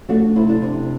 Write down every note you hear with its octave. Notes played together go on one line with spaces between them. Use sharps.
A3 D4 F#4
C3 E4
D4
C3